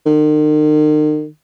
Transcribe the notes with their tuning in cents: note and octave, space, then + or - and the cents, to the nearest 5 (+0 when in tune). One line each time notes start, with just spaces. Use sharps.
D#3 -40